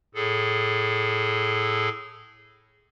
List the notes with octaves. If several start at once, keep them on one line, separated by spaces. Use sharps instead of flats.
A2 G#4 A4